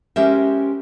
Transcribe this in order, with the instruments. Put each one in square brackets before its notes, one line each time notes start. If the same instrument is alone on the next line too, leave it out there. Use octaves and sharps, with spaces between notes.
[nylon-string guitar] G#3 C#4 G4 A#4 C5 E5